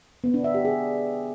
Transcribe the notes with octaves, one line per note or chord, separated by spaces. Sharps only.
B3
D4
E5
G4
G#4